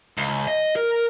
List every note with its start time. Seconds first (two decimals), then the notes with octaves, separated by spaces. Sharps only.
0.18 C#2
0.47 D#5
0.76 A#4